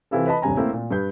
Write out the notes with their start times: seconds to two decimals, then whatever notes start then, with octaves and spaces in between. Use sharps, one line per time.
0.11 C3 E3 C4 E4 F4 A4
0.27 B4 D#5 A5 B5
0.42 D#1 G2 C3 G#5 A#5
0.57 A3 A#3 C4 E4
0.73 A#2
0.91 G2 B4 G6